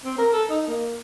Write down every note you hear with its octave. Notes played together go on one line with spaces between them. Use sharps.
C4
A#4
A4
D#4
A#3